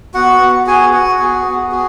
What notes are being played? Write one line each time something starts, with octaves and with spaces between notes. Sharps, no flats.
B3 F#4 F#5
B3
F#4 G#4 G#5
F#4 F#5
B3 G#4
B3
F#4 G#4